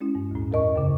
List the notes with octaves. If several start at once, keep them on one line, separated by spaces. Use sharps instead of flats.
G#3 C#4 E4
G2
D2 A2
E2 A#4 D#5 C#6
F#2 A2 C#3